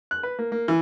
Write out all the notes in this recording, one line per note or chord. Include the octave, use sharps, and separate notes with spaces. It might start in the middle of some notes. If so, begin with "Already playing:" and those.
F#6
B4
A#3
A#3
E3